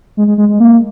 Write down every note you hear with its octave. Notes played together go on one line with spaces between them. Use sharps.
G#3
G#3
G#3
G#3
A#3